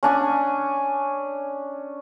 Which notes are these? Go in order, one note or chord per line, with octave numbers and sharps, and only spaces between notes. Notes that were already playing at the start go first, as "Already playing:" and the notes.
C#4 D4 G#5